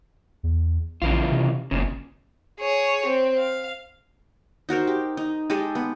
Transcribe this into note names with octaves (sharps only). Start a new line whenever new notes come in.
E2
A#1 C#3 E3 F4
C3
F#1 A#2 C#3
G#4 C#5
C4
F5
D#4 F#4 A#4 C5
G4
D#4
G#3 G4 A4 D#5
B3